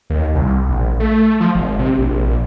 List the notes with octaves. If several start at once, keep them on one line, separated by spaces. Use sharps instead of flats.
D#2
C2
A#1
A3
F3
G#1
C3
A#1